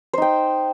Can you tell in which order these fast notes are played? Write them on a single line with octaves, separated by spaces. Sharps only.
C5 D#4 G5